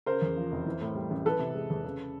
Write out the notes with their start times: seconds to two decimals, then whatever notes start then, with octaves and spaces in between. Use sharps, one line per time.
0.06 C#3 A#4 C5
0.22 E2
0.36 F3
0.52 F1
0.66 E3
0.81 A2
0.95 G3
1.10 A1
1.25 E3 A4 B4
1.39 C3
1.55 G#3
1.70 E2
1.84 C#3